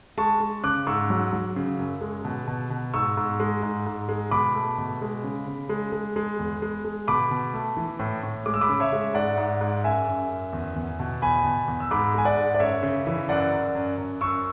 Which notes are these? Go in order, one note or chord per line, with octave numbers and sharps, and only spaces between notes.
G#3 A5 C#6
G#3
C#3 D6 F#6
G#2 C#6 E6
F#3
F#3
C#3
F#2
G#3
B2
B2
B2
G#2 C#6 E6
G#2
G#3
G#2
G#2
G#3
B2 B5 D6
A3
B2
G#3
C#3
C#3
G#3
G#3
G#3
E2
G#3
G#3
B2 B5 D6
B2
A3
E3
A2
A2
G#3 D6
E6
B5 D6
C#3
C#5 E5
G#3
G#2 D5 F#5
G#2
G#2
F#2 E5 G#5
F#2
F#2
E2
E2
B2
E2 G#5 B5
B2
E2
E6
G#2 B5 D6
G#3 G#5
D5 F#5
G#2
D5
F#2 C#5 E5
C#3
E3
F#2 D5 F#5
F#2
F#2
F#2
F#2 C#6 E6